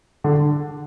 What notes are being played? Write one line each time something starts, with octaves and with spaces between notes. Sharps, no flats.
D3